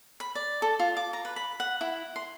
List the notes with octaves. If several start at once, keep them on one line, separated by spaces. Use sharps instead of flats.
B5
D5
A4
F4
D6
A#5
B4
B5
F#5
E4
C6